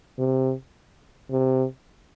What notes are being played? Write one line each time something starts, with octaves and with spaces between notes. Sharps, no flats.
C3
C3